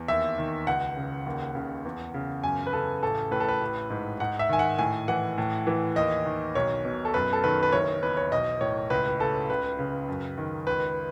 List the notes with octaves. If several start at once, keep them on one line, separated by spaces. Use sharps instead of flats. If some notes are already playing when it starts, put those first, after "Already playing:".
Already playing: E2
D#2 E5
D#3
C#2 F#5
C#3
D#2
C#3
E2
C#3
F#2 G#5
B4
C#3 A4
A1 A4
A2 B4
A4
B4
A1
G#2
G#2 F#5
E5
D#3 G#5
F#5
A2 G#5
E3 F#5
A2
E3
D#2 D#5
D#3
B1 C#5
B2
A4
F#2 B4
A4
D#3 B4
B4
F#1 C#5
E2 B4
C#5
B1 D#5
A2 C#5
C#2 B4
C#3 A4
C#2 B4
C#3
F#2
D#3
C#2 B4